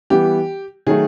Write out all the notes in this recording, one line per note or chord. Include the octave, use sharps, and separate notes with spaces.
E3 G3 B3 G4
D#3 F#3 A3 G#4